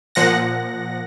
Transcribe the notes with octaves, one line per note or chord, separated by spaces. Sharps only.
A#2 F3 F#5 A#6